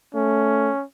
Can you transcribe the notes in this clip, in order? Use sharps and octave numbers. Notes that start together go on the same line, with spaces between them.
A3 C#4